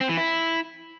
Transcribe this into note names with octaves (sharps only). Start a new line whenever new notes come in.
C4
E3
E4